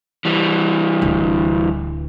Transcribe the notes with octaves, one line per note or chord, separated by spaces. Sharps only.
E3 G3
D1 D3